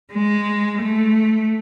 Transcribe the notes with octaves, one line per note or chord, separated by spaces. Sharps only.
G#3
A3